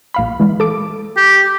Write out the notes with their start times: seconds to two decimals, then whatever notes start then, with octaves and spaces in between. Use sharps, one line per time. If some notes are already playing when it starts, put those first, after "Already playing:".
0.14 A#1 F5 B5
0.40 E3 G#3
0.60 A4 D6
1.17 G4